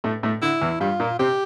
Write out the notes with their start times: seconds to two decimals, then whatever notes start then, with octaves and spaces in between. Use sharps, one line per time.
0.04 A2 A3
0.23 A2 A3
0.42 D3 E4
0.61 E2 E3
0.80 G2 G3 F4
1.00 A#2 A#3
1.19 C3 C4 G4